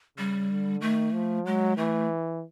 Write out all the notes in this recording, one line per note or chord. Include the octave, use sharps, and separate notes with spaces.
C#3 G3
D3
D#3 A3
F3
F#3 G#3
E3 A3